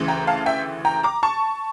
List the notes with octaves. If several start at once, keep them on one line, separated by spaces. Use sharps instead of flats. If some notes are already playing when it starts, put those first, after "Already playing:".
Already playing: D2 C#3 E3
G5 A#5
F5 A5
E5 G5
G5 A#5
A#5 D6
A5 C#6